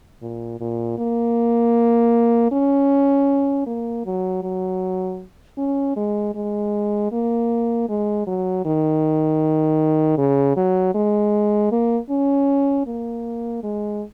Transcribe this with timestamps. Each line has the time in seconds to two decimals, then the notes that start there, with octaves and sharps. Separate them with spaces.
0.22 A#2
0.60 A#2
0.98 A#3
2.52 C#4
3.66 A#3
4.05 F#3
4.43 F#3
5.58 C#4
5.96 G#3
6.35 G#3
7.12 A#3
7.89 G#3
8.27 F#3
8.65 D#3
10.18 C#3
10.57 F#3
10.95 G#3
11.72 A#3
12.10 C#4
12.87 A#3
13.63 G#3